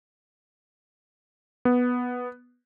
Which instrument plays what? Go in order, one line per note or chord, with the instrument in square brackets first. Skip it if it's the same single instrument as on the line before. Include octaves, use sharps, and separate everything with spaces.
[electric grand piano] B3